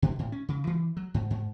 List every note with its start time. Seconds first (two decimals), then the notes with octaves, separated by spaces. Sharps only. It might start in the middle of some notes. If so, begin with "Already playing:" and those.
0.02 B2
0.19 A2
0.32 C#4
0.49 C#3
0.67 E3
0.97 F#3
1.14 G#2
1.30 G#2